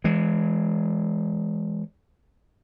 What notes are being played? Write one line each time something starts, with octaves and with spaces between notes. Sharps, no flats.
E3 G#3